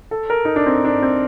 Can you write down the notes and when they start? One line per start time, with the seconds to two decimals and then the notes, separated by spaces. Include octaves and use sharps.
0.11 A4
0.30 A#4
0.45 D#4
0.56 D4
0.66 C4
0.85 D4
1.02 C4